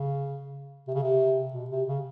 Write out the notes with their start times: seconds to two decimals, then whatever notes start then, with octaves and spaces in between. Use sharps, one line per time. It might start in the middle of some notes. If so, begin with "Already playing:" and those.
Already playing: C#3
0.87 C3
0.94 C#3
1.03 C3
1.53 B2
1.70 C3
1.87 C#3